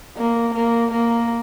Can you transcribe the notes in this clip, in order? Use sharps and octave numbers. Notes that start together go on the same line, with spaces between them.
A#3
A#3
A#3